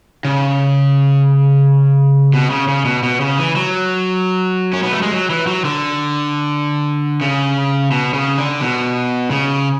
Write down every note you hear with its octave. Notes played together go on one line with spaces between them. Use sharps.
C#3
B2
C#3
C#3
B2
B2
C#3
E3
F#3
C#4
B3
A3
G#3
F#3
E3
F#3
D3
C#3
B2
C#3
D3
B2
C#3